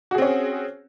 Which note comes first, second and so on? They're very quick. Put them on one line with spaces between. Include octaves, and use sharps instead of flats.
F#4 G#4 C4 C#4